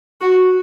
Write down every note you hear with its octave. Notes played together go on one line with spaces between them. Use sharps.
F#4